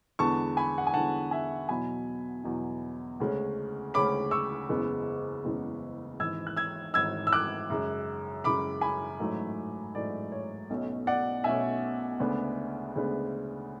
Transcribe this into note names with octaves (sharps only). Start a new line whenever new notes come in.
E2 D3 G#3 B3 A5 C#6
G#5 B5
F#5
G#5
E2 D3 G#3 B3 F#5 A5
E5 G#5
E2 B2 F#3 G#5 B5
E2 B2 F#3
D2 C#3 G#3 C#4
D2 C#3 G#3 C#4 B5 D6
C#6 E6
F#1 E2 C#3 G#3 B3
F#1 E2 C#3 G#3 B3
G#1 G#2 E3 E6 G#6
F#6
E6 G#6
G#1 G#2 E3 E6 G#6
E6
D6 F#6
F#2 C#3 G#3
F#2 C#3 G#3 B5 D6
G#5 B5
A1 G#2 F#3 A3
A1 G#2 F#3 A3 D5
C#5
B1 B2 A3 C#4
D5 F#5
B1 B2 A3 C#4 E5 G#5
D2 C#3 G#3 B3 D4
D2 C#3 G#3 B3 D4